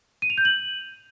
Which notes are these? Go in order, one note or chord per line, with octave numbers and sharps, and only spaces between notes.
D#7
F7
G6
F#7